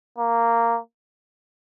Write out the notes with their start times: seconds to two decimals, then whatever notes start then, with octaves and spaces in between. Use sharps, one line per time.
0.19 A#3